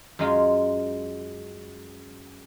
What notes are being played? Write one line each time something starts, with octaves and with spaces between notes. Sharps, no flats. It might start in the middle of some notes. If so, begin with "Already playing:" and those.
F#2 G#3 F4